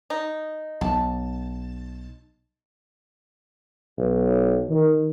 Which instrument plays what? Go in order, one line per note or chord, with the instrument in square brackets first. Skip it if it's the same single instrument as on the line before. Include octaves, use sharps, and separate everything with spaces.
[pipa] D#4
[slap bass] B1 [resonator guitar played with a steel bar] A5
[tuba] B1
D#3